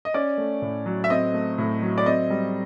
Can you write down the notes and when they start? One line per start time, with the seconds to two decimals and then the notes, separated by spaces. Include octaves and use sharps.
0.05 D#5
0.14 C#4 D5
0.37 A3
0.62 A2
0.86 F#3
1.04 E5
1.10 C4 D#5
1.34 A3
1.58 A2
1.82 F#3
1.98 D5
2.06 C4 D#5
2.30 G3